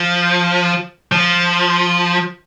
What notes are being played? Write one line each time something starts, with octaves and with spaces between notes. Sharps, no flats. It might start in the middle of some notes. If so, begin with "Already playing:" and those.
Already playing: F3
F3